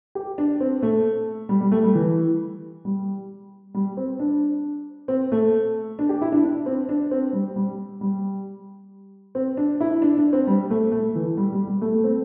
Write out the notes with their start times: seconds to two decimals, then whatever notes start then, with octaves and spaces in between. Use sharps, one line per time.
0.15 G4
0.38 D4
0.60 C4
0.82 A3
1.49 G3
1.61 G3
1.72 A3
1.84 G3
1.95 E3
2.85 G3
3.74 G3
3.97 C4
4.19 D4
5.08 C4
5.32 A3
5.99 D4
6.09 G4
6.22 E4
6.32 D4
6.44 D4
6.66 C4
6.89 D4
7.11 C4
7.33 G3
7.56 G3
8.01 G3
9.35 C4
9.57 D4
9.80 E4
10.02 D4
10.17 D4
10.33 C4
10.47 G3
10.70 A3
10.92 A3
11.15 E3
11.37 G3
11.52 G3
11.67 G3
11.81 A3
11.94 A3
12.04 C4